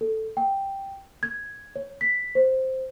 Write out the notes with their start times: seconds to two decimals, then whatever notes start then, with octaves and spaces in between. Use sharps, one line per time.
0.01 A4
0.37 G5
1.23 G#6
1.76 C#5
2.01 B6
2.35 C5